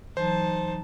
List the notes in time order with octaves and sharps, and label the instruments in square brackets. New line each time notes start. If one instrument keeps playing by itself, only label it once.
[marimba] E3 F#3 [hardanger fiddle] D#4 A5 [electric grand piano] C5